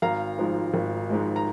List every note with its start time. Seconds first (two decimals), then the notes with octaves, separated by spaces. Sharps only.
0.02 G#1 F5 A#5
0.38 G#2 F3 G#3
0.74 G#1
1.10 G#2 F3 G#3
1.36 A#5